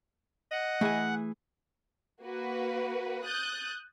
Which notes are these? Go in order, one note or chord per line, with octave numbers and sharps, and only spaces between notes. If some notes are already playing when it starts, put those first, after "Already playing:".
D#5 F#5
E3 A3 G#4 G#5
A#3 F#4 B4
D#6 F#6 G6 A6